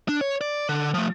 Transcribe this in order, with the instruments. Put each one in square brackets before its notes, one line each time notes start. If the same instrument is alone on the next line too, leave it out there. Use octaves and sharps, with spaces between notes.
[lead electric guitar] D4
C#5
D5
D3
F3 A3